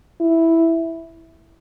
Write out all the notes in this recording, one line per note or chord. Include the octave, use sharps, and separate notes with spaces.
E4